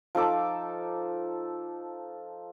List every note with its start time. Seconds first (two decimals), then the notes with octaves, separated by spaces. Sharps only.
0.15 F3 D#4 A4 D6